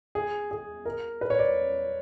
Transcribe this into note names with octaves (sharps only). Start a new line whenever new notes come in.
G#4
G#4
A#4
B4
C#5
D5